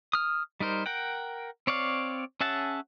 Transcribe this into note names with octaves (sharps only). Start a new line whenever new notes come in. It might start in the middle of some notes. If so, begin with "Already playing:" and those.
D#6 F6
G3 D#4 A#4 C5
A#4 F#5 G5
C4 C#5 D5 F5
C#4 G#4 E5 F#5 A5